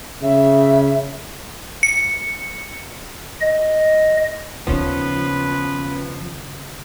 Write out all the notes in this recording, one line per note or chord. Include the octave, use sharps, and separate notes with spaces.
C#3 E5
C#7
D#5
D#2 C#3 F3 B3 C#4 B4